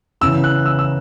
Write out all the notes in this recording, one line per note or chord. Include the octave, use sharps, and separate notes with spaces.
E2 C#3 E3 E6
F#6
E6
E6